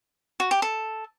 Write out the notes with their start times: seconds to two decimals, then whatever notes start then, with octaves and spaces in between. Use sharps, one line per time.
0.40 F#4
0.51 G4
0.62 A4